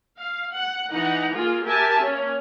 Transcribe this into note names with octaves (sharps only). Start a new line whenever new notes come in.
F5
F#5
E3 D#4 F#5 A#5
A#3 F4 G#4
G4 A#4 E5 G#5 A5
A#3 C#4